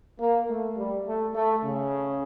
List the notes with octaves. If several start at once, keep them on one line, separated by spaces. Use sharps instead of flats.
A#3
A3
G3
A3
A3
C#3